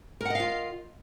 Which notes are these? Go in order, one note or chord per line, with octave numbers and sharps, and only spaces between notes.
F4 A#4 D#5 F5 F#5